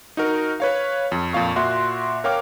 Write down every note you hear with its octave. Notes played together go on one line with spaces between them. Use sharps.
D#4 F#4 A#4
B4 C#5 F5
F2
F2 A#2 F5 C#6
A#2 F#4 E5 C6 F#6
A#4 C#5 F5 G5 D6 F6